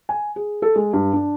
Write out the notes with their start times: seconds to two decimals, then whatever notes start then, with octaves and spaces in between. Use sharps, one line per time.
0.09 G#5
0.36 G#4
0.62 A4
0.76 G#3
0.93 G2
1.13 D4